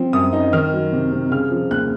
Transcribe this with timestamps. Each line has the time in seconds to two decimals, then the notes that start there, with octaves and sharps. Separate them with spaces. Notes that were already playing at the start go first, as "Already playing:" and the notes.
Already playing: F3 C4
0.13 F#2 D#6
0.33 D#4
0.53 D#3 F6
0.73 F#3
0.93 C3
1.12 C3
1.32 C#3 F6
1.51 F3
1.71 D#2 F#6